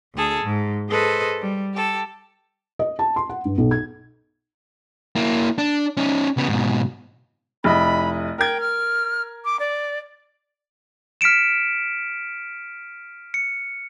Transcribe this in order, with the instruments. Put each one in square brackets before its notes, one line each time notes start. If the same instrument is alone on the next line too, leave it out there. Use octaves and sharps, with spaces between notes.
[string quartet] D2 G#4 A4
G#2
G#4 A4 B4 C5 D#5
G3
G4 A4
[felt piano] D#5
A5
C6
F#5
G2
B1
G#6
[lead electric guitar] A#3 E4
D4
C#4 D#4
C#3 B3
G#2 B2
[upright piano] F1 E4 D#5 [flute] B5
[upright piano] A#4 G#6 [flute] G5
[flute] F6
D6
D5
[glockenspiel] F6 B6 C#7 D7 E7
C#7